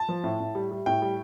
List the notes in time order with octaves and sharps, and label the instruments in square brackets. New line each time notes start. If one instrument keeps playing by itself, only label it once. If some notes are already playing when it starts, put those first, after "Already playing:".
Already playing: [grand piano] A5
F3
A2
A2
G3
G3
A2 G5
G3